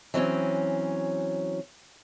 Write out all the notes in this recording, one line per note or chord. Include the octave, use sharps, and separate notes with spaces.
E3 F#3 C4 C#4